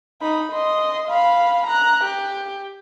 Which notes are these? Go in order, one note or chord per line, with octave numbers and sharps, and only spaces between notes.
D#4 B5
D#5 C6
F5 B5
A#5 F#6
G4